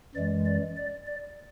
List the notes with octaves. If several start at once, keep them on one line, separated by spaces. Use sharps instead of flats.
F#2 E3 G#3 D5
D5
D5
D5